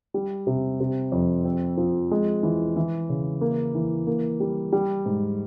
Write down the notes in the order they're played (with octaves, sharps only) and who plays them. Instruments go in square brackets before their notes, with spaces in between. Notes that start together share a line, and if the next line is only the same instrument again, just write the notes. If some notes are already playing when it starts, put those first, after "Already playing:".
[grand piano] G3
C3
C3
F2
C4
F3
G#3
E3
E3
C#3
A#3
E3
A#3
G3
G3
G#2